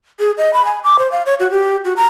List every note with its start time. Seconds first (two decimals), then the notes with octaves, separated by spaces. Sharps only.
0.19 G#4
0.38 D#5
0.53 B5
0.65 G#5
0.84 D6
0.99 C5
1.12 F5
1.26 C#5
1.40 F#4
1.51 G4
1.85 F#4
1.96 A#5